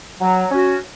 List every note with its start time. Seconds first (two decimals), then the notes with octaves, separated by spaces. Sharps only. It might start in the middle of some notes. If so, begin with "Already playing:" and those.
0.20 F#3
0.50 C#4 F#4